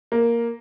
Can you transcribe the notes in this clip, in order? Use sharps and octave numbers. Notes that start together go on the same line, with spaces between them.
A#3